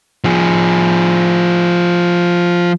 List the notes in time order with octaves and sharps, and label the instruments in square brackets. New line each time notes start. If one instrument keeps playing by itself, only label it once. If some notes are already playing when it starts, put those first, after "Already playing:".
[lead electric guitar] F3 G#4